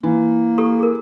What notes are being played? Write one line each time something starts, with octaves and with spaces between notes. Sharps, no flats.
E3 A#3
G4 A4 C#6
G#4 A#4